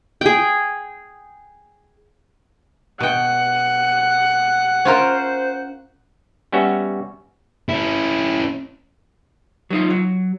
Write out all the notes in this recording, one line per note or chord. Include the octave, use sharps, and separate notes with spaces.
G#4 G5
B2 F#5 G5
C#4 F4 A#4 C5
G3 B3 C#4 F#4 E5
C#4 E4
F#3 D#4 F4
F#3